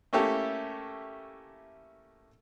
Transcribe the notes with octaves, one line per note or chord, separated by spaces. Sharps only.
A3 A#3 C#4 E4 G4 A4